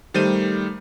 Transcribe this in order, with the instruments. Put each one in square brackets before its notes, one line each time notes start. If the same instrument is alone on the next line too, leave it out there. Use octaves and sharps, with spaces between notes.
[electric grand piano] D#3 G3 A3 C5 G6 D#7